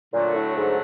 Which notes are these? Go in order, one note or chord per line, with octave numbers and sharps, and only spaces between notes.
A#2 D3 F#3 A3
A2
G#2